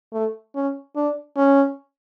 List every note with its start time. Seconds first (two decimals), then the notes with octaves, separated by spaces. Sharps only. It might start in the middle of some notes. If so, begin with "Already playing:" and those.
0.13 A3
0.55 C#4
0.96 D4
1.37 C#4